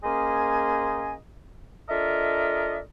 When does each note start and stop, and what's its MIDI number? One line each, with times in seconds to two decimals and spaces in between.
0.04 1.15 58
0.04 1.15 61
0.04 1.15 68
0.04 1.15 72
0.04 1.15 75
0.04 1.15 80
1.89 2.80 62
1.89 2.80 65
1.89 2.80 69
1.89 2.80 70
1.89 2.80 75
1.89 2.80 76